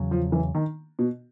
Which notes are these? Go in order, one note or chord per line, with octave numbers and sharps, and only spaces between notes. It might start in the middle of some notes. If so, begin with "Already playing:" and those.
Already playing: E2 C#3 F#3
F3
E3
D#3
B2